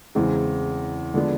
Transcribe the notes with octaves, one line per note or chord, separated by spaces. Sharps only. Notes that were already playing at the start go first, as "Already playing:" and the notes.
E2 C#3 E3 G#3 C4
D3 F3 G#3 B3 D4